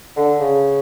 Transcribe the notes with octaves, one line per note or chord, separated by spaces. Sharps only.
D3
C#3